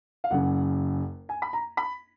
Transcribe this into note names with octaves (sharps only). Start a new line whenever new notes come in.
F5
F#1 F#2 C#3 F#5
G#5
B5
A#5
B5